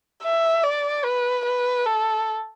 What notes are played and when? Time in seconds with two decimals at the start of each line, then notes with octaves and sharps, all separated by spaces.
0.23 E5
0.64 D5
1.04 B4
1.45 B4
1.86 A4